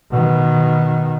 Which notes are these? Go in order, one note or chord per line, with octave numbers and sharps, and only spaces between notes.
B2 D#3